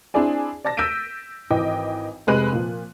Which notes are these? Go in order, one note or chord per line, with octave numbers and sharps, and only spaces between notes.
C4 D4 E4 G#4 D5 G#5
D5 A5 A6 A#6
E6 G6 B6 D7 D#7
G#1 E3 D#5 G5 D6
F1 C3 G#3 B4 F#6 D#7
A#2 F3